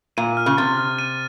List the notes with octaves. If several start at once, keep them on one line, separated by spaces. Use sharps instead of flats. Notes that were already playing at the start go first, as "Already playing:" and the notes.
A#2 D#7
F6
C#3
C3 A6
F6
D#7